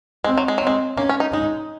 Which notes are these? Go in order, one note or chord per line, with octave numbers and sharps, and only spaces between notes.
G#3 C4
F#3
G#3
F#3 C4
G#3
A#3 C#4
C#4
D#4
G#3 D#4